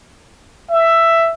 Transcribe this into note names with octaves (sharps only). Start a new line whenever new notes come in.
E5